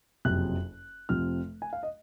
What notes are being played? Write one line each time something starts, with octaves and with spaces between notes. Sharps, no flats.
F#1 F2 C3 F#3 F#6
F1 F2 C3 F3 C4 F6
G#5
F5
D#5